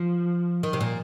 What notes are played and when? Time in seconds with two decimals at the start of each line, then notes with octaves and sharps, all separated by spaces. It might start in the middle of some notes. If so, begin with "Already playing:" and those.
Already playing: F3
0.63 D#3
0.73 C3
0.81 A#2